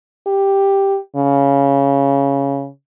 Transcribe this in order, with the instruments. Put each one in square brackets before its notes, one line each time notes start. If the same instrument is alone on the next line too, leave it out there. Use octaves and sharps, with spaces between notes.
[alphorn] G4
C#3